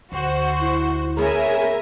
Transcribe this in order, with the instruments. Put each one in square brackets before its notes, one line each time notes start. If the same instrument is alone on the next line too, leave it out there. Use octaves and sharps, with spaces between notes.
[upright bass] D2 [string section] F#4 C5
[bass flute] E4
[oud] A#3 B3 C#4 [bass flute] G#4 [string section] A#4 E5 G#5